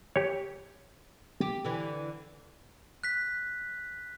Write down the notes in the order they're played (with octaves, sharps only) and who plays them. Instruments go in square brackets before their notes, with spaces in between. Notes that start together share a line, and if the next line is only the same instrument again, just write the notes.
[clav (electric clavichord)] G4 C#5
[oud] G4
D3 E3
[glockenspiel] F#6 B6